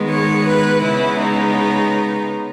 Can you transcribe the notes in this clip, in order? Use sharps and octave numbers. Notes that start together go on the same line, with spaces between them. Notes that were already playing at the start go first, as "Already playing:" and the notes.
Already playing: D#3 G#3 B3
C#5
B4
C#3 G#3 B3 E4
D#4